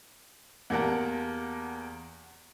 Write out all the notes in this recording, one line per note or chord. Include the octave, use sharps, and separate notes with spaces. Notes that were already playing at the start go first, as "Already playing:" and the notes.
E2 A#3 G4 A#4 F#5 A5